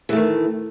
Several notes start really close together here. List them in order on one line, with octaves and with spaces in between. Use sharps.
E3 A3 D#3